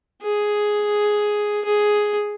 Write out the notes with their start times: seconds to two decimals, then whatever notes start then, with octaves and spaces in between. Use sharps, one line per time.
0.22 G#4
1.65 G#4